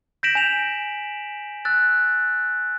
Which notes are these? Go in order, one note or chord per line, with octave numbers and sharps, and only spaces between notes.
G6 A#6 B6 D7 E7 F#7
G#5 G6 F7
E6 F#6 A6